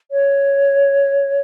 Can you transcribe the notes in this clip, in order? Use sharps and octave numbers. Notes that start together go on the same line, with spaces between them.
C#5